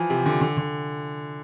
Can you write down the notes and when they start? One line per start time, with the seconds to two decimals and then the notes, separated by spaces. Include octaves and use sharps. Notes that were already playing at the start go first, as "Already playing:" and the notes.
Already playing: E3 F3
0.10 C3
0.26 D3
0.41 D3
0.57 D3